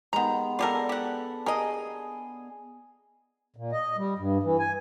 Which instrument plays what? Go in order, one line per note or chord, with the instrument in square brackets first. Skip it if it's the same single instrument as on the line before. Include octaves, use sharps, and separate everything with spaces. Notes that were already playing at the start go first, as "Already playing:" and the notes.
[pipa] D#3 A#5 [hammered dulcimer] G#3 B3
[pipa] F4 G4 A#4 [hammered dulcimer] A4 D5
[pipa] G4 F#5
[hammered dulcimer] G#4 [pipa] A#4 D#5
[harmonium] A#2
D#5
G3
G2
E3
G#5